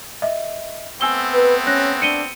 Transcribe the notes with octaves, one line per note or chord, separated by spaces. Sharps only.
D#5 E5
A3 B3 C4 G#5 E6 G7
B4
C#4 F#6 A#6
D4 C#7 D#7 G7